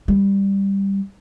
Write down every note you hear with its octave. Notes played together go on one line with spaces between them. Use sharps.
G3